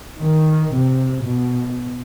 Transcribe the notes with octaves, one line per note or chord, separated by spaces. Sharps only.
D#3
C3
B2